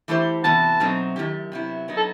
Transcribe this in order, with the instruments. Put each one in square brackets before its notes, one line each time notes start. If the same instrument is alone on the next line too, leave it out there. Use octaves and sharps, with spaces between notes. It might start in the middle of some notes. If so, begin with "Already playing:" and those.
[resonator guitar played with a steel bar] E3 A3 E4 G4 C5
[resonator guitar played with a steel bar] C3 E3 B3 F#4 [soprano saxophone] A5
[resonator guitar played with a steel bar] B2 F#3 A3 C4 D#4
F#2 D#3 A3 E4 G4
C3 F#3 B3 E4
F#3 B3 D#4
[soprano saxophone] A4